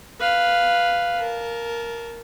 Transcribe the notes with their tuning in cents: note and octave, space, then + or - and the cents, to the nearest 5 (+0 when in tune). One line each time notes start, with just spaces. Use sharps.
B4 +0 F5 +0
A#4 +0 A5 -25